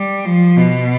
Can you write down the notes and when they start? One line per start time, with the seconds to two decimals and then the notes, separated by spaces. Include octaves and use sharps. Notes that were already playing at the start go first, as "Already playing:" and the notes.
Already playing: G3
0.25 F3
0.57 B2